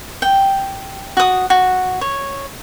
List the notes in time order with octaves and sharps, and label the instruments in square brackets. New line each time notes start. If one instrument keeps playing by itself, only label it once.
[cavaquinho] G5
F#4 D#6
F#4
C#5